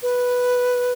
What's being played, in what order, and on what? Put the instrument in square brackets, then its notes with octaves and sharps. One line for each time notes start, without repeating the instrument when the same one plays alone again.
[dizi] B4